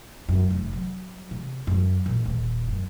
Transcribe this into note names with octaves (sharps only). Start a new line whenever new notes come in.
F#2
F1
F#3
C3
F#2
A#1
D#1
F#2